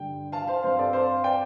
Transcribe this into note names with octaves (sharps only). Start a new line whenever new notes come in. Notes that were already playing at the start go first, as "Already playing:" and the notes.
Already playing: G2 D3 G3 G5
F5 A5
C5 F5
G2 G3 C4 C5 F5
A4 D5
C5 F5
D5 G5